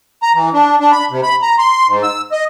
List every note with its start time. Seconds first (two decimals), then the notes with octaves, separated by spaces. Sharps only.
0.23 A#5
0.35 E3
0.54 D4
0.80 D4
0.92 B5
1.10 C3
1.23 B5
1.42 A#5
1.59 C6
1.87 G#2
2.03 E6
2.32 D#5